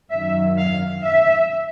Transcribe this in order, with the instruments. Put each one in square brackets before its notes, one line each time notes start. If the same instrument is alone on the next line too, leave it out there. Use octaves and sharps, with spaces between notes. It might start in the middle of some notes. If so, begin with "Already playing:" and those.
[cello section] F#2 D#3 F#3 E5
F5
E5